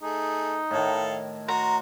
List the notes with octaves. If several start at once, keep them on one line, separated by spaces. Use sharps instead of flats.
A3 D#4 G#4
A2 D#3 E4 A4 F5
F#4 A#5 C6